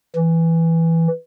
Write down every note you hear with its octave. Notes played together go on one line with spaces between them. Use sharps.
E3